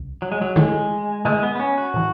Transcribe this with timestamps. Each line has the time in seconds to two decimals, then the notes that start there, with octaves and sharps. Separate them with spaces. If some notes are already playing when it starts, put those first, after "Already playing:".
Already playing: C#2
0.22 F#3
0.32 G#3
0.42 F#3
0.56 G#2 D#3 G#3 A3 E4
1.25 G#2 D#3 G#3 A3 E4
1.43 B3
1.56 B3
1.60 C#4
1.78 F#4
1.94 A2 E3